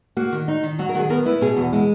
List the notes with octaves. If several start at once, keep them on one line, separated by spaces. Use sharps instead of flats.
A#3 F#4
D#3
D#4
D#3
F#3 F#4
A#4
D#3 F#4
G#4
B3 A#4
E4 B4
B2 G#4
E2 F#4
G#3 E4